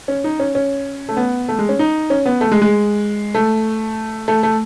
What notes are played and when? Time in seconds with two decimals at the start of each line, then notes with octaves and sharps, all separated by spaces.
0.08 C#4
0.24 D#4
0.40 C#4
0.55 C#4
1.09 A3
1.17 B3
1.48 A3
1.59 G#3
1.69 C#4
1.79 D#4
2.10 C#4
2.26 B3
2.41 A3
2.52 G#3
2.62 G#3
3.35 A3
4.28 A3
4.43 A3